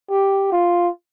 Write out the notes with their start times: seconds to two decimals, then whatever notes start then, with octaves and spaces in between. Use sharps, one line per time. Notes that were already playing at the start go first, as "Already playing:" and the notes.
0.11 G4
0.52 F4